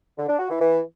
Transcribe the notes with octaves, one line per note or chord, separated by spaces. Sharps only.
D3
D4
F#4
E3
E3